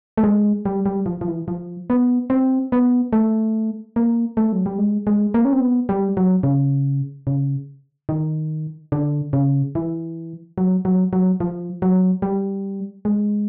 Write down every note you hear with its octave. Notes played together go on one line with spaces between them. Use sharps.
A3
G#3
G3
G3
F3
F3
E3
F3
B3
C4
B3
A3
A#3
A3
F#3
G3
G#3
G#3
A#3
C#4
C4
B3
G3
F#3
C#3
C#3
D#3
D3
C#3
E3
F#3
F#3
F#3
F3
F#3
G3
G#3